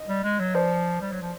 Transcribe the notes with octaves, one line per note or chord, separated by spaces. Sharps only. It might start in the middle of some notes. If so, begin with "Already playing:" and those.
Already playing: D#5
G3
G#3
F#3
F3 C5 D5
G3
F#3
F3